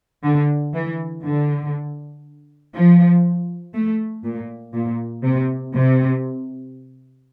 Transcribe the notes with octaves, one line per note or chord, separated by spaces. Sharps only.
D3
E3
D3
F3
A3
A#2
A#2
C3
C3